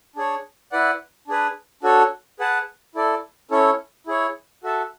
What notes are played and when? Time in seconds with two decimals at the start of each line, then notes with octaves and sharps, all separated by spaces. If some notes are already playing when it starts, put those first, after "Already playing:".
0.16 D4 G#4 C#5
0.72 E4 B4 D5 F#5
1.28 D4 G#4 B4
1.83 D4 F#4 A4 C#5
2.40 G#4 B4 F#5 A5
2.95 E4 A4 D5
3.51 C#4 E4 A4 C#5
4.07 E4 G#4 C#5
4.63 F#4 A4 E5 A5